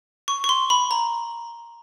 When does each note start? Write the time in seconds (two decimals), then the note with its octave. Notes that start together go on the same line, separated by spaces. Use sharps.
0.28 C#6
0.44 C#6
0.49 C6
0.70 B5
0.91 A#5